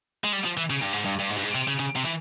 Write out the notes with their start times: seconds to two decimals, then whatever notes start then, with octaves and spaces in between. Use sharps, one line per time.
0.24 G#3
0.33 G3
0.45 F3
0.57 E3
0.70 C#3
0.82 G2
0.93 G#2
1.05 G2
1.19 G2
1.30 G#2
1.38 G2
1.43 G#2
1.55 C3
1.68 C#3
1.79 C#3
1.96 C3
2.05 E3